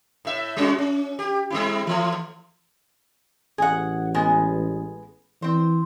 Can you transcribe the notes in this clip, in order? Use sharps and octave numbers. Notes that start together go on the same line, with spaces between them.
A2 E5
G3 C#4 F#4
C#4
G4
G3 C4 E4
E3 A3
A1 G#4 F#5
G#3 B3 G#4
E3 C4 C5